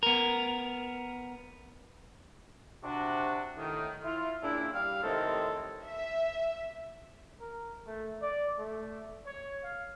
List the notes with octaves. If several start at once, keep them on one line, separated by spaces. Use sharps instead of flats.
B3 A#4
C3 D4 F#4
A2 D#3
E4 F4
A#2 C#3 D4 E4
G3 F5
A2 C3 D#3 G#3 C4 A4
E5
A#4
A3
D5
A3
C#5
F5